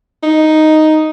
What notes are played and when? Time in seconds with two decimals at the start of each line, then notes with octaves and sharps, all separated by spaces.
0.23 D#4